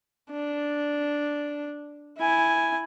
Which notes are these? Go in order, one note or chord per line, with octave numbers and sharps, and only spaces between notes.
D4
E4 G#5